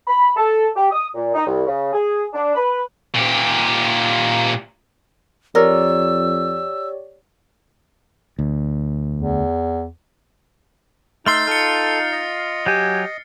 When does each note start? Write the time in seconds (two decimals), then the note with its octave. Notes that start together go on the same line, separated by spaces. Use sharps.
0.07 B5
0.36 A4
0.76 G4
0.92 D#6
1.15 A#2
1.34 D#4
1.46 C2
1.66 C#3
1.93 G#4
2.33 D4
2.55 B4
3.15 A#2 G4
5.55 F2 G4 A#4 C#5 D5 E6
8.39 D2
9.15 E2
11.26 A3 D#4 C6 E6 F6 A6 C7
11.47 F4 A4 F6 C#7
12.12 D#5
12.66 F#3 G4 G#5